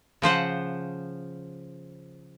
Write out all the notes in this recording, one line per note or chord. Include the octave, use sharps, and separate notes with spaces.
C#3 F3 C5 F#5